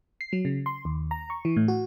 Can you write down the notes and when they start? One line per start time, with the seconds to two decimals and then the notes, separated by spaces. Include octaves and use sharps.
0.21 C7
0.33 F#3
0.45 C#3
0.66 C6
0.85 D#2
1.11 A#5
1.30 C#6
1.45 E3
1.57 A2
1.68 F#4